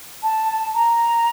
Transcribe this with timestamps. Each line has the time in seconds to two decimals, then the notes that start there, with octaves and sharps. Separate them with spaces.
0.23 A5
0.74 A#5